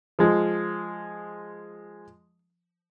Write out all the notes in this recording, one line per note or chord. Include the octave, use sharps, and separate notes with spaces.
F3 G#3